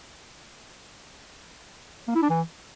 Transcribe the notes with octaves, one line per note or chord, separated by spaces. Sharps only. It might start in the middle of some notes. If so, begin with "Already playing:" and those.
A#3
E4
D4
E3